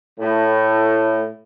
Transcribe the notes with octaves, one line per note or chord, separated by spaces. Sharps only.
A2